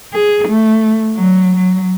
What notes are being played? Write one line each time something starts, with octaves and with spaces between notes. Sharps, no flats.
G#4
A3
F#3
F#3